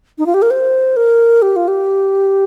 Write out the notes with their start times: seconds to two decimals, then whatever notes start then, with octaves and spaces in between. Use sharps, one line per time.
0.18 D#4
0.26 F4
0.34 G4
0.42 A#4
0.50 C5
0.96 A#4
1.42 G4
1.56 F4
1.68 G4